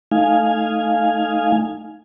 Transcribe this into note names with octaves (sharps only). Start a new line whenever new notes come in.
A3 D#4 F5 G#5